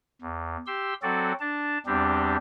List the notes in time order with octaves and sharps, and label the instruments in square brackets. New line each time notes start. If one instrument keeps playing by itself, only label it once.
[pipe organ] E2
G4 C6 E6
F#3 C4 F#4 A4 D5
D4 A5
E2 G3 C4 D4 G4